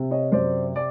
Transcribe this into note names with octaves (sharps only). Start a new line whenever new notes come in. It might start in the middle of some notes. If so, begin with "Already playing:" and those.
Already playing: C3
C#5 D#5
F#2 C5 D5
D5